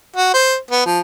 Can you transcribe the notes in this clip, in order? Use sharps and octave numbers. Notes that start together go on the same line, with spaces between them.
F#4
C5
B3
F3